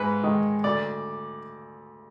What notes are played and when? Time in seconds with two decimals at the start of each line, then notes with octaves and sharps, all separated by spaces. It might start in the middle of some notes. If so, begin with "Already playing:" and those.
Already playing: G#2 G#3 B4
0.23 D#3 G#3
0.64 D2 D5